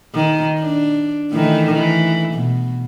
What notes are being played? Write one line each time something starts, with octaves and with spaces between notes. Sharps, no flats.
D#3
D4
D#3 E3 A3
E3
B2